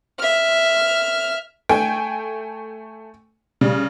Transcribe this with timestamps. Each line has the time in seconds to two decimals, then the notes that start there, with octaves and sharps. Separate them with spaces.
0.19 E5 F6
1.69 A3 G5 G#5
3.61 C#3 G3